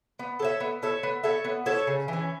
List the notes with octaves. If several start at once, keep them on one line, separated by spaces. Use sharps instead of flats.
B3
A4 C#5 E5
B3
A4 C#5 E5
B3
A4 C#5 E5
B3
A4 C#5 E5
C#3
E3 C#4